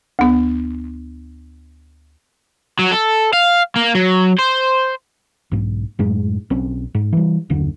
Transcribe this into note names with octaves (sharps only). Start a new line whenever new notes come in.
D2 B3
F#3
A4
F5
A#3
F#3
C5
B1 G#2
F#2 A2 G#3
B1 C4 C#4
G#2
E3 G3
F#1 D#2 D3